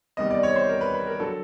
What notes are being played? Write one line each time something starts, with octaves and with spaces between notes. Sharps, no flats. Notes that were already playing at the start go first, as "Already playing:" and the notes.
E2 C3 D#3 G3 D#5
D5
C#5
C5
A#4
B4
B4
A#4
D3 F#3 A4